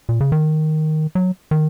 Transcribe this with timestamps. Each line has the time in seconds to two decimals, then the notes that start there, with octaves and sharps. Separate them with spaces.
0.09 A#2
0.21 C#3
0.32 D#3
1.15 F#3
1.51 D#3